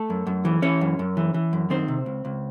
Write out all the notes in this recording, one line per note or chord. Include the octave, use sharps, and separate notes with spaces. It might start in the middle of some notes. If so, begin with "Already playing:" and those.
Already playing: A3 A4
F#2
F#2
E3
E3 C#4 C#5
F#2
F#2
E3
E3
F#2
D#3 C4 C5
C3
C#2
C#2